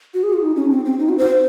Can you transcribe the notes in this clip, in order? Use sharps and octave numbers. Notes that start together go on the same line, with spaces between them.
F#4
G#4
F4
D#4
C#4
C4
C4
D#4
F#4
C5